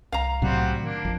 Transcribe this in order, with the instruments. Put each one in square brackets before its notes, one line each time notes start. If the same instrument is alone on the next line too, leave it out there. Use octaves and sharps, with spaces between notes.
[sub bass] C2 [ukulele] F5 A#5
[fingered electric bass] A2 C3 F#3 [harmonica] G3 C4 F#4
[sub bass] D#3 [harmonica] A#3 D4
[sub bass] A1 [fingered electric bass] F2